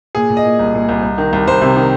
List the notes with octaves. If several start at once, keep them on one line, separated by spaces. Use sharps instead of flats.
A#2 G#4
A#2
D#5
A#2
C2
A#2
C2
C2
D#3
C2
C2 C5
C3
D#3